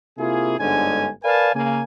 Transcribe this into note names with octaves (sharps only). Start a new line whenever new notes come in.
C3 A#3 E4 F4 G#4
G1 G#2 D3 G#3 C#4 G#5
A#4 B4 D5 F5 G#5 A5
C#3 A#3 G#5